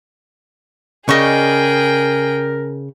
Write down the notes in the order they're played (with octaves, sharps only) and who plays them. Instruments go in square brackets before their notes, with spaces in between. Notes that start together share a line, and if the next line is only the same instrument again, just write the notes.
[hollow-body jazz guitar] C#3 [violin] G#4 G5 [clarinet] A#4 [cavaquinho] D5 D#5 C#6